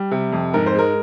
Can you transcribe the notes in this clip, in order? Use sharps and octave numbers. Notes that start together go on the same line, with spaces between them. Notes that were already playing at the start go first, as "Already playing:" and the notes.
Already playing: G3
C3
F2
G#2 A#4
C5
G#3 A#4